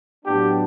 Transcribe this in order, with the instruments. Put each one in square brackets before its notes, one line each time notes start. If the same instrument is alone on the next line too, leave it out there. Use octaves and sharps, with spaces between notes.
[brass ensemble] A2 F#3 B3 D4 [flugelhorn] G4